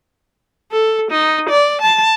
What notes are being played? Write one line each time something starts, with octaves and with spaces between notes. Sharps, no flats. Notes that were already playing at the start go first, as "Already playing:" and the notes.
A4
D#4
D5
A5